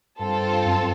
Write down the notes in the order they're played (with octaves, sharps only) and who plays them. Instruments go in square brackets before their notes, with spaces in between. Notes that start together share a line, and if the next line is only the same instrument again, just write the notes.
[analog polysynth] G2 [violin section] C4 F4 A4
[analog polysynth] F#2